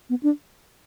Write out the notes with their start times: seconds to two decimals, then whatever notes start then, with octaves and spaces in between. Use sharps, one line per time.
0.10 B3
0.23 D4